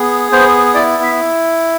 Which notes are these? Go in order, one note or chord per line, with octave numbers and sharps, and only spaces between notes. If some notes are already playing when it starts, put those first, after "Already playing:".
Already playing: B3 G#4
B3 C5
E4 D5
E5